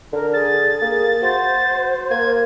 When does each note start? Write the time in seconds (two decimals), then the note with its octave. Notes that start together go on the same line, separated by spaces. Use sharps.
0.13 D3 A#4
0.34 G#4 A6
0.82 A#3 G#4
1.22 F#4 C5
2.11 A#3 G#6